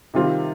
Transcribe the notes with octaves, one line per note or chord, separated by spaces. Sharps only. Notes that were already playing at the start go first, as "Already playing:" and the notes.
C3 D#3 G3 C4 F4